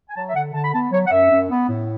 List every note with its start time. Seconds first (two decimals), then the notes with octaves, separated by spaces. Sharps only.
0.09 G#5
0.16 F#3 A5
0.28 E5
0.34 D3 F#5
0.54 D3 A5
0.63 B5
0.73 B3 A5
0.92 F#3 C#5
1.06 F#5
1.11 F#2 E5
1.31 F#2
1.50 B3
1.68 A2